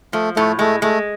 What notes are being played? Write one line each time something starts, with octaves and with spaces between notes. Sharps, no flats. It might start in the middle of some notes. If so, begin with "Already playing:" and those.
F3 A3
A2 A3
G#3 A3
G#3 A3